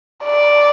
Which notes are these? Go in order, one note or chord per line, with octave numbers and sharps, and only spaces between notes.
D5